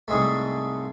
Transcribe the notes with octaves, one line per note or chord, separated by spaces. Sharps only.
C2 G#2 G#3 A3